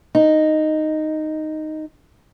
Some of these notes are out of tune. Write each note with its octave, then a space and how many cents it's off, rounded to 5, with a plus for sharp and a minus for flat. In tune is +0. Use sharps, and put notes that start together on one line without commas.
D#4 -5